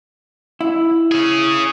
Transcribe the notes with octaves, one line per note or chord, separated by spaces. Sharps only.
E4
C#4 G#4